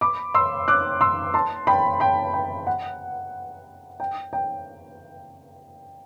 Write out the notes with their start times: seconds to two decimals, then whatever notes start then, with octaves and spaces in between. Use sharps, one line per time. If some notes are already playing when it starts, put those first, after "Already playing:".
0.01 B5 D6
0.34 C6 E6
0.68 D6 F#6
1.01 C6 E6
1.34 A5 C6
1.67 G5 B5
2.00 G5 B5
2.34 G5
2.67 F#5
4.00 G5
4.33 G5